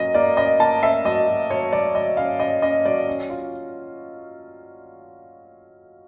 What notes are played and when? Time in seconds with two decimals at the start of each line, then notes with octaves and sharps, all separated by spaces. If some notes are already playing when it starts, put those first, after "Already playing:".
Already playing: F#3 A#3 C#4 D#5
0.14 A#3 D5
0.37 C#4 D#5
0.60 A#3 A5
0.83 C#4 E5
1.05 F#3 D#5
1.27 F#3
1.50 F#3 C#5
1.73 F#3 D5
1.94 F#3 D#5
2.17 C#4 F5
2.40 C#4 D#5
2.62 C#4 D#5
2.85 F#3 D5
3.08 C#4
3.30 F4